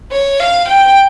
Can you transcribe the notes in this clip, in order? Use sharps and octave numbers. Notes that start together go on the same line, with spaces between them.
C#5
F5
G5